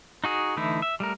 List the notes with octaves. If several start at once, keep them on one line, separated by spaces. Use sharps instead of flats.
D#4 F#4 G#4
D3 E3 A3 D#4 E4
E5
G3 A3 A#4